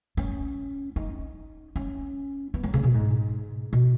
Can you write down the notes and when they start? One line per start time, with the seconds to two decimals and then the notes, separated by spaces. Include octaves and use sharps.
0.17 C#4
0.96 D#4
1.76 C#4
2.54 B3
2.63 F#3
2.74 C#3
2.84 B2
2.94 G#2
3.73 B2